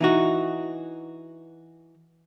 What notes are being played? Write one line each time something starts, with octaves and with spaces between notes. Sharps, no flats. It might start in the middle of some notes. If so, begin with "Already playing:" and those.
E3 D#4 F#4